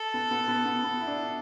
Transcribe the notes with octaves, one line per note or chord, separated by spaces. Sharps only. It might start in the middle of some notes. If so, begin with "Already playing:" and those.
Already playing: A4
B3
B3
B3
B3
B3
E4
D4